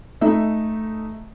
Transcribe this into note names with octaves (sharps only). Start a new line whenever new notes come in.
A3 D#4 E5